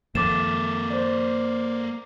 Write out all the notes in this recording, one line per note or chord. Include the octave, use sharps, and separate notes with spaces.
F#2 D#3 F3 A#3 A4 D6 A6 E7
C5 D5